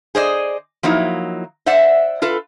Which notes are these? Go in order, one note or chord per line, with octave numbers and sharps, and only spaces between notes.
G#4 C5 D5 D#5
F3 F#3 A#3 D#4 E4
C5 D5 E5 F#5
F4 A4 B4